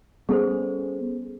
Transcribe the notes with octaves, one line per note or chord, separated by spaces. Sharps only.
G3 B3 C#4 G#4 A4 C5